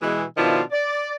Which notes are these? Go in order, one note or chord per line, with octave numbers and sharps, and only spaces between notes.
B2 E3 G#3
B2 D#3 F3 D4 E4 F4
D5